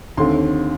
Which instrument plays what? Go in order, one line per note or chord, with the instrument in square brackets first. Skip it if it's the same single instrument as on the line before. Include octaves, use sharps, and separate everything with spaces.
[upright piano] D#2 D3 A3 C4 C6